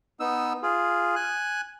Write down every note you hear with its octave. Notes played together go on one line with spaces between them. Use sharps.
B3 D#4 E6
F4 G#4
G#5 F#6